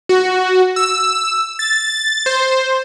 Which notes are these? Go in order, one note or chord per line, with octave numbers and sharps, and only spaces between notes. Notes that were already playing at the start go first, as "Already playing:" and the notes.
F#4
E6
A6
C5